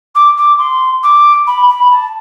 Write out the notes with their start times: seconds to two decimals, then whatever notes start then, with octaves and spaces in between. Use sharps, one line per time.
0.15 D6
0.37 D6
0.58 C6
1.03 D6
1.47 B5
1.69 B5
1.90 A5